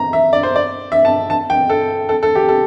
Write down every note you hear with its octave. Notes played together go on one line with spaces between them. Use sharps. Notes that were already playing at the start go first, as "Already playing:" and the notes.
Already playing: A#5
E5
D5
C5
D5
E5
A5
A5
G5
A4
A4
A4
G4
A4